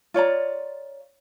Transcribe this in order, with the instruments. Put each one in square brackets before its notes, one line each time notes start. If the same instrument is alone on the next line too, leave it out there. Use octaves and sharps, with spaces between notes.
[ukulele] F4 C#5 D5 A#5